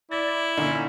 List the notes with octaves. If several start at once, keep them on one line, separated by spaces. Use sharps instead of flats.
E4 D5 A6
A#2 D3 C#4 D#4